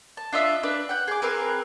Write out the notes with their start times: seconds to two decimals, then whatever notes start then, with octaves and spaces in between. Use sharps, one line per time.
0.17 A5
0.33 D4 F4 D#5 E5
0.63 D4 B4 D5
0.89 F#5 G5
1.08 G#4 D6
1.22 C4 G#4 A#4 B4